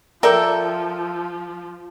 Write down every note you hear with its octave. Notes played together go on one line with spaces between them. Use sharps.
F3 A4 A#4 D5 E5 G5